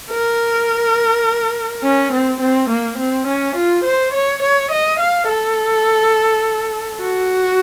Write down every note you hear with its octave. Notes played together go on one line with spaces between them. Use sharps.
A#4
C#4
C4
C4
A#3
C4
C#4
F4
C5
C#5
C#5
D#5
F5
A4
F#4